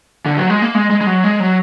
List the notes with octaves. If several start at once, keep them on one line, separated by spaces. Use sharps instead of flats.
D3
F#3
G#3
A#3
G#3
G#3
G#3
F#3
G#3
F#3